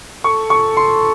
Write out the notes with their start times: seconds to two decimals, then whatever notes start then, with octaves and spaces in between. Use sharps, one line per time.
0.24 A4 C#6
0.50 C#6
0.77 C6